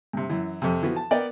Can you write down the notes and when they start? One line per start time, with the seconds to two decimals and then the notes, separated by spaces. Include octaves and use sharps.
0.13 G2 C3
0.29 F#2 E3
0.62 F2 C3
0.82 E3 F3 B3 F#4
0.96 A5
1.11 B3 A#4 D5 G5